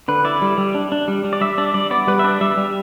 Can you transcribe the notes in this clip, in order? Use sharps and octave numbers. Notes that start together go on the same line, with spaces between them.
D3 B4
E4 D5
G3
G3
D4
D4
G3
G3
D5
G3 E5
D4 D5
G3 D5
B3 D5
G3 B4
E5
D4 D5
G3 E5
G3